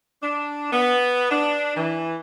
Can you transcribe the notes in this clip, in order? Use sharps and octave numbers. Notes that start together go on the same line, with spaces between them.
D4
B3
D4
E3